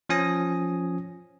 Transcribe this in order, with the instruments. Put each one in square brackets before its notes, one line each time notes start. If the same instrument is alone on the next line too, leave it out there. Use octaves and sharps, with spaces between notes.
[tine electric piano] F3 C#4 G#5 D#6 A#6